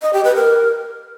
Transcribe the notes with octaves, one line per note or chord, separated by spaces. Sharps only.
D#5
G4
B4
A#4